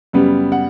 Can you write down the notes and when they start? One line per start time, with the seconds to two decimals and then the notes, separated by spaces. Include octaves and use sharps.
0.13 F#2 C#3 G3 B3
0.52 F#5